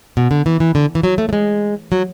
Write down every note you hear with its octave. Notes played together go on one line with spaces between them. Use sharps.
B2
D3
E3
E3
D3
E3
F#3
A3
A3
G#3
F#3